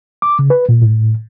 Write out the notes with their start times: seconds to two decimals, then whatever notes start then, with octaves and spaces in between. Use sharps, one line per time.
0.22 D6
0.39 C#3
0.50 B4
0.69 A#2
0.81 A2